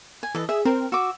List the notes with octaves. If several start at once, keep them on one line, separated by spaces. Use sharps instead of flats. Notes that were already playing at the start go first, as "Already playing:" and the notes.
G#5
E3 A4 D#5
G#4 E5
C4 A#4
F#4 D6 E6